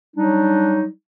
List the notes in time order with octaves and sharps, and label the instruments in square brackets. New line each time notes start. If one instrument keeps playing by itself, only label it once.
[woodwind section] F#3 G3 D4 D#4